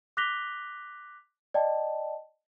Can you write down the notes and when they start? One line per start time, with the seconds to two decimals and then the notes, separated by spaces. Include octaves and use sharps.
0.17 D6 F#6 A#6 B6 F7 G7
1.54 D5 D#5 G5 A5